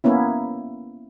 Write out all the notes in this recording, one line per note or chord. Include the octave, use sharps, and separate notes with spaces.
A#3 B3 C#4 E4